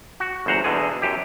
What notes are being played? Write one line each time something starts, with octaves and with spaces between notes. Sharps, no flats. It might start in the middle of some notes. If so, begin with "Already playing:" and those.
F#4
G1 E2 C5 F#5 A#5
E2 B2 D3 G#4
F#2 G4